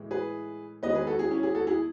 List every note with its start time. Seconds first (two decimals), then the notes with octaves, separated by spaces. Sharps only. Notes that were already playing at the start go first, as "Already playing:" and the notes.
Already playing: A2 E3 G#3
0.11 G#4 B4
0.83 E2 D#3 G#3 B4 D#5
0.95 G#4 B4
1.07 F#4 A4
1.19 E4 G#4
1.31 C#4 E4
1.43 E4 G#4
1.55 F#4 A4
1.67 E4 G#4